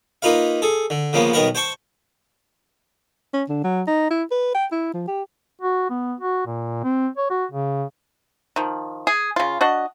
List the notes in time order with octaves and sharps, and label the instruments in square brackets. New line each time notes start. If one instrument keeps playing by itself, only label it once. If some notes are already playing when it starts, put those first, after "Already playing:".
[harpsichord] A#3 D#4 F4 B4 F5
G#4 A4
D3
C#3 F3 A#3 B3
B1 D#3 B3 A#4 B4
C5 G5 A5 C#6
[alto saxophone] C#4
D3
F#3
D#4
E4
B4
G5
E4
F3
G4
[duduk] F#4
B3
F#4
A#2
C4
C#5
F#4
C#3
[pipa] D#3 F3
G#4
C#3 F4
D4 F#4 D#5